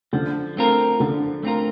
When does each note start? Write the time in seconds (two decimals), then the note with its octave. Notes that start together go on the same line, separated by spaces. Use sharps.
0.13 D3 F3
0.57 A3 C4 F4 A#4
1.00 D3 F3
1.43 A3 C4 F4 A#4